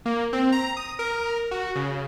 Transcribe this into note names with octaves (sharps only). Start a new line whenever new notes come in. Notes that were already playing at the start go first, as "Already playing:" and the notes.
A#3
C4
A#5
D#6
A#4
F#4
C#3